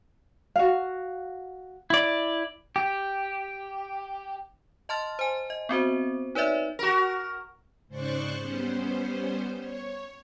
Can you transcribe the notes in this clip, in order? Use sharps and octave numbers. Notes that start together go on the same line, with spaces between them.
F#4 F5
E4 D5
G4
D#5 A5 C6 F6 A6
C5 G#5
D#5
B3 C4 F#4 C5
D#4 B4 C#5 D5 E5
F#4 A#4
G#2 C#3 C5 D5 C#6 F#6
G3 B3 C#4 C5
C#5